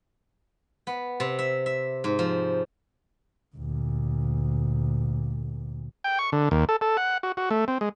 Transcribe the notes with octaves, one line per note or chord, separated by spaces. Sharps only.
B3
C3
E5
E5
G#2
F3
D2 A#2
G5
C#6
D3
D#2
A4
A4
F#5
F#4
F#4
A3
C4
G#3